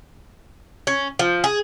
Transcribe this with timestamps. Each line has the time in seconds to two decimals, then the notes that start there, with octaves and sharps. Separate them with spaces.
0.87 C#4
1.19 F3
1.44 G#4